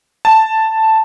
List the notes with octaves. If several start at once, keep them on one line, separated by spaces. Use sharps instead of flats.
A5